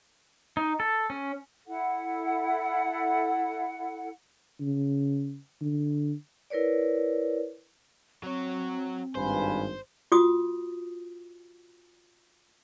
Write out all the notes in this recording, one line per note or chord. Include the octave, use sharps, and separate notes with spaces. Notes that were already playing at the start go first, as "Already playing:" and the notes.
D#4
A4
C#4
E4 A4 F#5
C#3
D3
E4 A#4 B4 C#5 D5
F#3 C4 C#5
G#1 G2 F4 B4 C5 G#5
F4 F#4 D#6